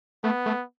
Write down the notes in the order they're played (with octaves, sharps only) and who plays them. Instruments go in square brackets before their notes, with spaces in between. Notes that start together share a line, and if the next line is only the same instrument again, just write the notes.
[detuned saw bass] A3 [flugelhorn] B3
[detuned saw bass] A3